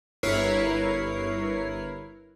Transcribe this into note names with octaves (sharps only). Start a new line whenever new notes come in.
G1 E4 A#4 B4 C#5 C7